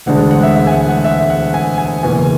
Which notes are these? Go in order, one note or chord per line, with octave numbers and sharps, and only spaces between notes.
E1 D2 D3 G#3 D4 F#5
F#5
E5
E5
G#5
F#5
F#5
E5
F#5
G#5
G#5
F#1 E2 B2 G#5